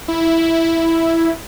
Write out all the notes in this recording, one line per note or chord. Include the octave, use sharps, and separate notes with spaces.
E4